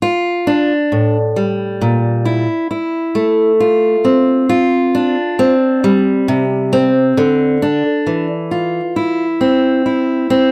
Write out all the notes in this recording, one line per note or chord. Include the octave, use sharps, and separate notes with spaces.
F4
D4
A2
G3
A#2
E4
E4
A3
F4
C4
F4
D4
C4
G3
C3
C4
D3
D4
E3
F4
E4
C4
E4
C4